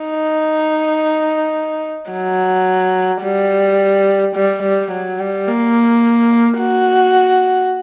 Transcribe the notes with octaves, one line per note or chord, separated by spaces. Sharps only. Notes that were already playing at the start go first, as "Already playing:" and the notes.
Already playing: D#4
F#3
G3
G3
G3
F#3
G3
A#3
F#4